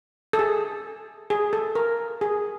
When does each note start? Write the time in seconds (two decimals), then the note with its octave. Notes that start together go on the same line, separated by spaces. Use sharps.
0.33 A4
0.39 G#4
1.30 G#4
1.53 A4
1.75 A#4
2.21 G#4